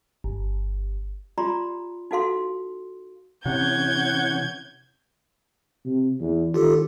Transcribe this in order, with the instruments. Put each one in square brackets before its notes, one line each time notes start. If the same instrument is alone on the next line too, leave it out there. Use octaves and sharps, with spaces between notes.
[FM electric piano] G1
[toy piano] F4 G4 D5 A#5 C6
D#4 F#4 A4 F5 C6
[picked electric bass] C3 [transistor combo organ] E3 C#4 [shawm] F#5 [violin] G6 G#6
[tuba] C3
E2
[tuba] D#3 [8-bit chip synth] F4 G4 A4